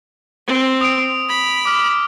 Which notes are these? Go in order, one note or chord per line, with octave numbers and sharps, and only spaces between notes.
C4
D#6 D7
B5
D6 F6